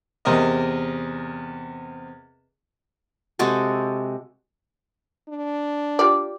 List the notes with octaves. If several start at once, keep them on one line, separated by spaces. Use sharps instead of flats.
E2 C3 C4 A#4 D#5
C3 G#3 F#4 A4
D4
F4 G4 D5